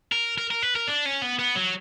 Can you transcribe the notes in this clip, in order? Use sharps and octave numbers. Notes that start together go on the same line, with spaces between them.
A#4
A#4
A#4
B4
A#4
D4
C#4
B3
B3
F#3